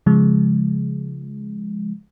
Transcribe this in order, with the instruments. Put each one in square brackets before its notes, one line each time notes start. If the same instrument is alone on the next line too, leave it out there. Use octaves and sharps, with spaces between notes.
[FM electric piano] C#3 F3 G#3